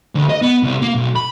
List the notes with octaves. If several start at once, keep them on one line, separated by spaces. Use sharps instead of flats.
D2
D#5
B3
C2
A#3
B1
B5